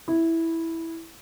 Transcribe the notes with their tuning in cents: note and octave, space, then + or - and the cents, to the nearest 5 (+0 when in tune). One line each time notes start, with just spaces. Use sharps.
E4 -5